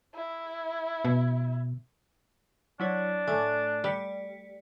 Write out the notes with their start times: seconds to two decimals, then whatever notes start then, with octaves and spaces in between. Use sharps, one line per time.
0.15 E4
1.05 B2
2.80 F#3 D4 E4 C#5
3.27 A2 A3 G#5 D6
3.84 G3 D5 B6 C#7